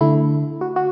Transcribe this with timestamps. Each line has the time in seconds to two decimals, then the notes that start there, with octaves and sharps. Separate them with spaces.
0.01 D3 A3 E4
0.61 F#4
0.76 F#4